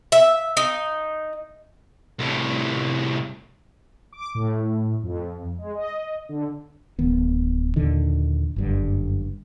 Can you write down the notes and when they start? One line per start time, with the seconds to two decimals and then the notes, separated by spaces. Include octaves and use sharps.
0.12 E5
0.57 D#4
2.19 C2 A2
4.12 D6
4.35 A2
5.03 F2
5.59 G#3
5.75 D#5
6.29 D3
6.99 D1 D#3 B3
7.76 D#2 A#2 D3 D#3
8.56 F#1 G2 D3